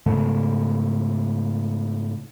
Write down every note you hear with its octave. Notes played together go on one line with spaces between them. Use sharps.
G#2 C#3 A3